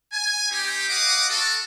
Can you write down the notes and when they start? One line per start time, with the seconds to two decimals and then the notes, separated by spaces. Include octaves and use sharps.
0.12 G#5
0.51 C4 D#4 G4
0.89 D#5 F5 F#5 D6 D#6
1.29 F#4 A4